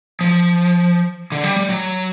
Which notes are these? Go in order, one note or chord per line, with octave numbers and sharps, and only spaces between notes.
F3
D3
G3
G3
F#3